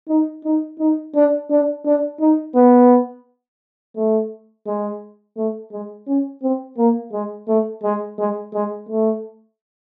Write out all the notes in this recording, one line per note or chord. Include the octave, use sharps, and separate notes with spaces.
D#4
D#4
D#4
D4
D4
D4
D#4
B3
A3
G#3
A3
G#3
C#4
C4
A#3
G#3
A3
G#3
G#3
G#3
A3